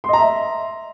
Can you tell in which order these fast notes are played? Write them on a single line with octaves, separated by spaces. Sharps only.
C6 D#5 A#5 E5